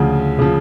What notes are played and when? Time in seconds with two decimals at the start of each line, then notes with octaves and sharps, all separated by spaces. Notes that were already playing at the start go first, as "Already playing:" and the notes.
Already playing: D2 C#3 F3
0.39 C#3 F3